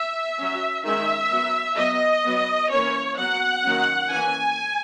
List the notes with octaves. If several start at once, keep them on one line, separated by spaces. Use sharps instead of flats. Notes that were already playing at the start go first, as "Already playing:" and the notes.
Already playing: E5
F#3 C#4
D#3 G#3 C#4 E5
F#3 B3
F#3 B3 D#5
F#3 B3
E3 A#3 C#4 C#5
F#3 B3 F#5
D#3 F#3 A#3 C#4
E3 A#3 C#4 G#5